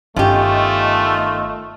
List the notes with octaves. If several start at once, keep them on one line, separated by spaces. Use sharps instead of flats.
G1 D#3 A3 C#4 F4 G4 D#5